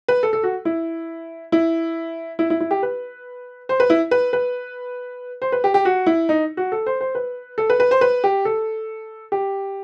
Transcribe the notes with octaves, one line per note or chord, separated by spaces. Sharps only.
B4
A4
A4
F#4
E4
E4
E4
E4
E4
G4
B4
C5
B4
E4
B4
B4
C5
B4
G4
G4
F#4
E4
D#4
F#4
A4
C5
C5
B4
A4
B4
B4
C5
B4
G4
A4
G4